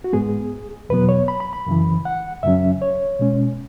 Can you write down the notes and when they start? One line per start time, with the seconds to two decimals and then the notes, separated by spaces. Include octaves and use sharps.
0.04 F#4
0.13 G#2 G#3 B3 G#4
0.89 E2 B2 F#3 B3 B4
1.09 C#5
1.28 B5
1.40 B5
1.53 B5
1.66 F#2 C#3 E3
2.05 F#5
2.43 F#2 C#3 F#3 C#4 E5
2.82 C#5
3.20 B2 G#3 C#4